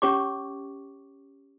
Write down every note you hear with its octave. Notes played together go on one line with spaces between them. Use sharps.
C#4 G4 C#5 C#6 D6